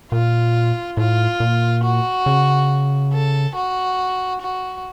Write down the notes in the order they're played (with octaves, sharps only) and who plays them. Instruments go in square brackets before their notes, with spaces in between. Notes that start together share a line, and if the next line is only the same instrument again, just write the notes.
[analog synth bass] A#2 [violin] F4
[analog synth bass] A2 [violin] F4
[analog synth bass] A#2
[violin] F#4
[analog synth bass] C#3
[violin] A4
F#4
F#4